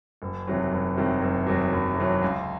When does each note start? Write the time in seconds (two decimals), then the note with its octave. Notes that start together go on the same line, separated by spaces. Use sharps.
0.22 F#1
0.47 E2 C3 D#3 F#3
0.72 F#1
0.97 E2 C3 D#3 F#3
1.22 F#1
1.47 E2 C3 D#3 F#3
1.72 F#1
1.97 E2 C3 D#3 F#3
2.22 C#2